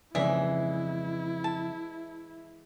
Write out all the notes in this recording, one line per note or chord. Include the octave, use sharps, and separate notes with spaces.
F2 C#3 E3 G#3 E4 G#4 D5 E5
A5